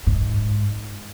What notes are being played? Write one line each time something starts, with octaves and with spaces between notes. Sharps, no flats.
G#2